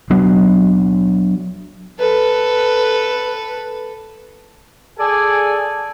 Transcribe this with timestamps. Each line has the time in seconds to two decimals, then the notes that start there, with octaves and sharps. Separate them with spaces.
0.10 F#3 B3 D4
2.00 A4 B4
4.99 G#4 A4 D5 G#5